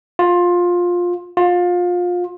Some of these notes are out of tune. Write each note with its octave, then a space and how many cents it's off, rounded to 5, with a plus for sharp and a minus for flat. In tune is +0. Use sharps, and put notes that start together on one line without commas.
F4 +15
F4 +25